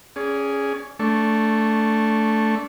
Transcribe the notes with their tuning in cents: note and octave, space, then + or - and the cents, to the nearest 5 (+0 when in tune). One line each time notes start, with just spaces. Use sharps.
C#4 +0 G#4 +0 D5 -35
A3 +0 D4 -25 C#6 -25